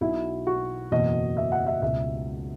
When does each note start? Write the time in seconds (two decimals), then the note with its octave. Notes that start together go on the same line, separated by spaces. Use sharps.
0.01 B1 B2 E4
0.47 F#4
0.92 F#1 E2 B2 D#5
1.37 E5
1.52 F#5
1.67 E5
1.82 C#2 B2 E5